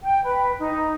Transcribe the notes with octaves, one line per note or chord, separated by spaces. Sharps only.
G5
B4
D#4